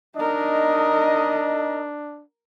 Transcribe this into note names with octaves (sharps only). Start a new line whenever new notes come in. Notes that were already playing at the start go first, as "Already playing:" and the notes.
D4 D#4 A#4 D#5